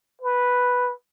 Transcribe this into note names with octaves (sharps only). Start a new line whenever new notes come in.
B4